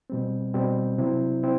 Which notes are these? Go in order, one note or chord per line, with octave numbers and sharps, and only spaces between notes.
B2 G3 C4
B2 G3 C4
C3 F#3 C4 E4
C4 E4